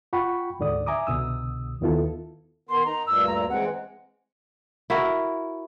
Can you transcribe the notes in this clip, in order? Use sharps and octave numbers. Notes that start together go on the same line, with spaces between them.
F4 F#5 G5 B5 C#6
D2 G#2 D3 D5 D#6
E5 G#5 A#5 D6 D#6
C2 B2 D3 D#6 E6
D#2 D#3 B3 E4 F4 A4
D#3 B3 C6
D#4 A#5
D2 G2 A#2 E6
A#5
E3 G#3 C4 F#5
E4 F#4 A#4